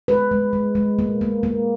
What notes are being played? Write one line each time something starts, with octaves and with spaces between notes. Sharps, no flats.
G#3 B4
G#3
G#3
G#3
A#3
A#3
A#3